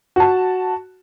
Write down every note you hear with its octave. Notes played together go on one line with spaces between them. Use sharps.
F#4 A5